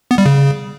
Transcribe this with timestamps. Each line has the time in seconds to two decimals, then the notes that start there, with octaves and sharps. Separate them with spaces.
0.11 B3
0.18 G3
0.26 C#3